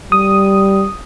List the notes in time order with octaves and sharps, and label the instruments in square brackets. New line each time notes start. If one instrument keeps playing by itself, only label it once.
[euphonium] G3 [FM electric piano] D#6